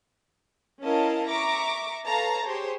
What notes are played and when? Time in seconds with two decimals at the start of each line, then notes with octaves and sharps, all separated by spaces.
0.82 C#4 E4 A#4 D#5 F5 A5
1.28 E5 A#5 C#6 D6
2.04 A4 B4 C#5 F5 A5 A#5
2.44 G4 G#4 C5 C#5